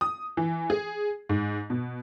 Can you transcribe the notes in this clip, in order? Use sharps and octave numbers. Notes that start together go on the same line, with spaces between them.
D#6
E3
G#4
G#2
B2